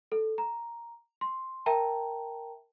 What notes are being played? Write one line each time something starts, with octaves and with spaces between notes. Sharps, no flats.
A4
A#5
C6
A#4 E5 G5 A5 A#5